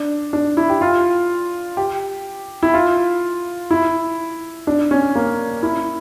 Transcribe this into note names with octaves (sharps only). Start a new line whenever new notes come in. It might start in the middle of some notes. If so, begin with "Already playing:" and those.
Already playing: D4
D4
E4
G4
F4
G4
E4
F4
E4
D4
C#4
A#3
E4